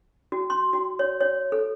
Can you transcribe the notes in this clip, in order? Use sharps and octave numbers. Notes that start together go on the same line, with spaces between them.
F#4
C6
F#4
C#5
C#5
A4